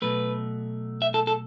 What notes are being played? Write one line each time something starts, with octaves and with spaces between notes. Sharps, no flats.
B2 F#3 A3 B4
E5
A4
A4